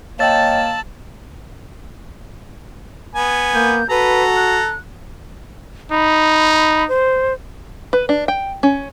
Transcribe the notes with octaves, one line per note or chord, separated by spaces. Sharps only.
A#3 C#5 D#5 G5 A5 E6 A6 E7
B3 G#5
A#3 G6
F#4 A4 B4 A#5
F#6
D#4 B5
C5
B4
D4
G5
C#4